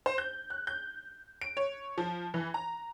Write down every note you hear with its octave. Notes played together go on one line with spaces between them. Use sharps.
C5
G6
F#6
G6
D7
C#5
F3
E3
A#5